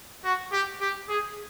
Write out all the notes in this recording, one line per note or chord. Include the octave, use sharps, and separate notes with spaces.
F#4
G4
G4
G#4